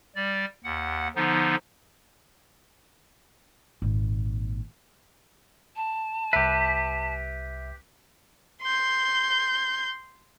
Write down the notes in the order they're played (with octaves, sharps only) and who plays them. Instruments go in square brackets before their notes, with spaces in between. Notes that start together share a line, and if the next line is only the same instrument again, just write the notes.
[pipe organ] G3 D5
D#2 F#5
D3 F3 B3 D#4
[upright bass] G#1 A#2
[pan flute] A5
[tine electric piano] C2 E5 [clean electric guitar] G4 B4
[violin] C6 G6